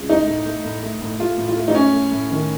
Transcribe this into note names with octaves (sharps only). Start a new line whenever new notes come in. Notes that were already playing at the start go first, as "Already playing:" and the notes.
Already playing: C#2
A3 D#4
A2
A3
A2
A3
A2
A3 F4
A2
F4
A3
D#4
A2 C#4
A3
A2
D#3